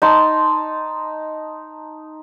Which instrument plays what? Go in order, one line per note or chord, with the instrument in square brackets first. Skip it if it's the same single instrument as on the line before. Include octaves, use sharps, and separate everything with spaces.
[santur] D#4 A5 C6